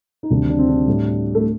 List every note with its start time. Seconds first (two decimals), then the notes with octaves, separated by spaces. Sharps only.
0.23 D#4
0.30 D2 C3 D#3 G3 D4
0.49 D4
0.59 C4
0.68 D4
0.87 A2 G3
1.35 A3